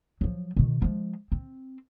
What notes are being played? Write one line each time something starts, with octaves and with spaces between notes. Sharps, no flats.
F3 F#3
B2 D#3
F3 G#3
C4